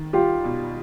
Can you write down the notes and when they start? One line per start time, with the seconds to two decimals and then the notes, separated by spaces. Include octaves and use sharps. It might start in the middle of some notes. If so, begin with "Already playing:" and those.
Already playing: D#3
0.13 G3 F4 G4
0.44 B2